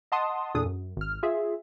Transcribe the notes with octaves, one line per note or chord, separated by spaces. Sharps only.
D#5 F#5 A5 C6 D#6
E2 A#2 D4 G#4 A4 D#6
F#2
G#1 F6
F4 G#4 E5